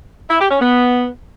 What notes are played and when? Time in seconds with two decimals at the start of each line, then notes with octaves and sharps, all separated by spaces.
0.30 E4
0.41 G4
0.51 C#4
0.61 B3